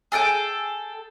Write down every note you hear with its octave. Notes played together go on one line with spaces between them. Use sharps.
G#4 A4 F#5 G5